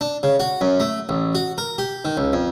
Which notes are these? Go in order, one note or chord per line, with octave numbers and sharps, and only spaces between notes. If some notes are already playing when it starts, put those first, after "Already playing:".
D4
C#3
F#4
F#2
A3
A1
F#4
A#4
G4
D#3
C#2
F2